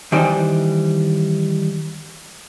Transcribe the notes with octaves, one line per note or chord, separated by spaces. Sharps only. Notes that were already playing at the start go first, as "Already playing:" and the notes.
D#3 E3 G3 D4 D#4 C5